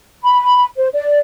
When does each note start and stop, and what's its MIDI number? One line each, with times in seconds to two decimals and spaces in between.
0.23 0.65 83
0.77 0.89 72
0.93 1.18 74